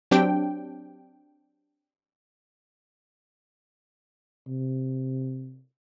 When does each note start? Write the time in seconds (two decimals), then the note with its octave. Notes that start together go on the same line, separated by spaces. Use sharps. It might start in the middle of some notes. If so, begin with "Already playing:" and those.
0.11 F#3 C4 D4 G4 G5
4.47 C3